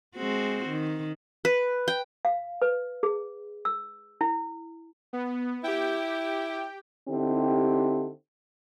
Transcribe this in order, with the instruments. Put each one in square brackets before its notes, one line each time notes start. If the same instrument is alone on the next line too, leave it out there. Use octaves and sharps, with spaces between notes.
[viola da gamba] G#3 C4 F#4
D#3
[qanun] B4
G5
[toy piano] F5
B4
G#4
E6
E4
[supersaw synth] B3
[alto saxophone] E4 [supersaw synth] G4 G5
[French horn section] D3 C4 D#4 E4 G4